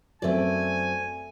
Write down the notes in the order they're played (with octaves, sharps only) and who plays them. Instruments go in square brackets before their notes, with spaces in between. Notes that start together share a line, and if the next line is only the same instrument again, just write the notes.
[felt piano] F#2 C4 C5 [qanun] A3 D5 [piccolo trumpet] G#5